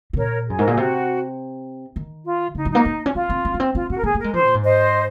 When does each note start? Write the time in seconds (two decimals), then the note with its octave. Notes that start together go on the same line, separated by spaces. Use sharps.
0.13 C3
0.17 A#2 A#4 C#5
0.47 F#2 G#4
0.58 G#2 A#4
0.67 A#2 G#4
0.77 C3 F#4
1.96 D#3
2.25 F4
2.55 C#3 D#4
2.65 F#3
2.70 A#3 D#4
2.85 A#3
3.06 C#4
3.14 C4 F4
3.30 C4
3.45 C4
3.54 A#3
3.60 C4
3.74 C4 F4
3.90 C4 F#4
3.98 A#4
4.04 A#3 G#4
4.15 A#3
4.19 G#3 A#4
4.34 F3 C5
4.44 A#2
4.54 G#2
4.63 C5 D#5